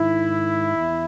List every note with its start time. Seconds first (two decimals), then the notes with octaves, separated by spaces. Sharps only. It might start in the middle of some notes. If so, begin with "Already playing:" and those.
Already playing: G#2 D#3 E4
0.76 E2